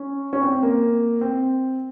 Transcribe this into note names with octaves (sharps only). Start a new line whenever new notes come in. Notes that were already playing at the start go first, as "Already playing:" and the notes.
Already playing: C#4
C#4
C4
C4
A#3
C4